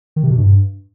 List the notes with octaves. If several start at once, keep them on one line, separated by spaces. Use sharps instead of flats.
D#3
C3
B2
G2